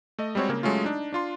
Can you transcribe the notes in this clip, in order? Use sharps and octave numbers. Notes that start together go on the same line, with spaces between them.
A3 D#5
G3 G#3 C4 F#4 C#5
C#3 A#3
F#3 G#3 A3 C#4 F4
D4 D#4
D4 F4 C6